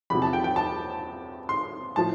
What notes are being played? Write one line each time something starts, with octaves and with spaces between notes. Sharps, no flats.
E2 C3 F3 B5
A5
G5
G5
A5
C6
A2 F3 A5